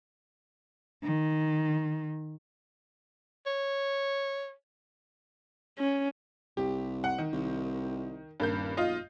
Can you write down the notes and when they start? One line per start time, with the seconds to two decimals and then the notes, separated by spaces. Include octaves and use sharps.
1.04 D#3
3.47 C#5
5.79 C#4
6.57 C2 G4
7.04 F#5
7.18 D#3
7.33 C2
8.40 D#1 G2 A#3 G6
8.77 B1 F4 D#5